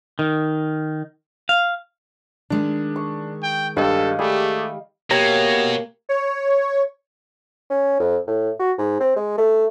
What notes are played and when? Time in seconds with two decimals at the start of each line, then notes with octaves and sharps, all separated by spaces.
0.19 D#3
1.49 F5
2.50 D#3 G#3 D4
2.96 C#6
3.43 G5
3.77 G2 G3 A4 D#5 F5 G5
4.19 G3 A3 G4 G#4
5.11 B2 A#3 G4 C#5 G5 A#5 G#6
6.09 C#5
7.70 C#4
8.00 F2
8.27 A2
8.59 F#4
8.78 G#2
9.00 C4
9.16 G#3
9.38 A3